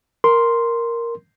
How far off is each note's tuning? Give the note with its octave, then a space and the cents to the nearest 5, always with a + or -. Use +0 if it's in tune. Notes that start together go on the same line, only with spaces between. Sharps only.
A#4 +0 C6 +0